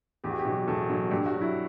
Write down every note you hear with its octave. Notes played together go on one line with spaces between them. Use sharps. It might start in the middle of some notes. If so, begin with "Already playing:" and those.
E2 G4
F#4
G4
B2 F#3
E2 A4
B2 F#3
G2 G4
F#4
F#3
E4